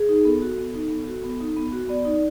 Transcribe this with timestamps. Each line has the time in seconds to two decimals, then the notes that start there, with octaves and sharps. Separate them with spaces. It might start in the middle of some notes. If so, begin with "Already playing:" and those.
Already playing: G#4
0.09 D#4
0.25 B3 A4
0.42 F#4
0.58 B3
0.75 D#4
0.91 B3
1.07 F#4
1.24 B3
1.41 D#4
1.57 B3
1.72 F#4
1.89 B3 D5
2.05 D#4